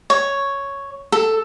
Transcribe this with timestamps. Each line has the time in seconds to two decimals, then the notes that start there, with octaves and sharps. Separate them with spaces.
0.10 C#5
1.12 A4